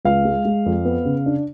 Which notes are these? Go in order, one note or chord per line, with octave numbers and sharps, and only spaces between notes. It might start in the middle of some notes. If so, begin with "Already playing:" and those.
C#2 F5
G#3
G#3
F2
B3
C#3
D4